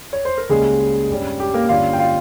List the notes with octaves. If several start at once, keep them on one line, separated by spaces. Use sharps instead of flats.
C#5
C5
A#4
C#2 C#3 G3 G#3 A#3 C#4 G#4
G2 G3 C#4
G4
A#3 A#4
G1 G2 G3 A#3 C#4 F4 F5
G5
F4 F5